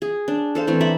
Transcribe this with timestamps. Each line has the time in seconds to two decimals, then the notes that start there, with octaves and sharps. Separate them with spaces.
0.02 G#4
0.28 D4
0.55 A4 C5 F5
0.67 E3 A3 C4
0.81 D5 E5 A#5 B5